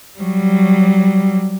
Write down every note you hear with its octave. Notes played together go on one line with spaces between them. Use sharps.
F#3 G3